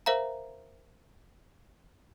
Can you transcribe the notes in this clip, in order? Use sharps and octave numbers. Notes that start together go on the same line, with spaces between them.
A#4 C5 E5 F5 A#5